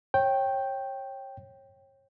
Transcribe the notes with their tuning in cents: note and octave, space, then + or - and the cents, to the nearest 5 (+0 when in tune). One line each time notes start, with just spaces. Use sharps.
C#5 -30 G5 +0